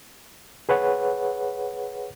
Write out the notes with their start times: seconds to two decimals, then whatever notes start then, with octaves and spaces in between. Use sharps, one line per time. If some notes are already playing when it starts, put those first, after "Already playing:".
0.69 G#4 B4 C#5 F#5